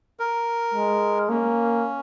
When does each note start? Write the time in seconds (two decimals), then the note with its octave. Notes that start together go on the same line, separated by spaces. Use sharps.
0.20 A#4
0.74 G#3
1.29 A#3 C#4